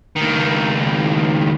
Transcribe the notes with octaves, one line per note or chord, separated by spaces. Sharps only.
C#2 D#3